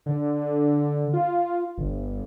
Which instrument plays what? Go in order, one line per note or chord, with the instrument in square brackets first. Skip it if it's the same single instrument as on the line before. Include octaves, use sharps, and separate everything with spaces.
[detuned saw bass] D3
F4
G1